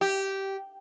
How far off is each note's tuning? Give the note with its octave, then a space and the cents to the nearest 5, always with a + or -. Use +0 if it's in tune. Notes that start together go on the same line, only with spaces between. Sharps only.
G4 -10